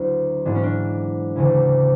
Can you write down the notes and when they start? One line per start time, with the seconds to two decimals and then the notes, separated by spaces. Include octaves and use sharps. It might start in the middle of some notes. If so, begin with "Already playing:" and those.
Already playing: D2 D3 F#3 E4
0.45 G#2 E3 D4
0.55 C#4
0.63 D4
1.36 D2 C#3 E3